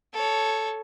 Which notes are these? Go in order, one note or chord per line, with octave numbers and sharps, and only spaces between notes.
A4 C#5